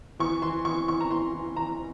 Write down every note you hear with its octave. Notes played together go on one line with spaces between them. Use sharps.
E3 C#6
E3 C6
E3 C#6
E3 C#6
A#5
E3 C6
E3
E3 A#5